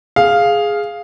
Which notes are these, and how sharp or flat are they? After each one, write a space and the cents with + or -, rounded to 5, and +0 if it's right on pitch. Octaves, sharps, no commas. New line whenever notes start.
G#4 +0 F5 +0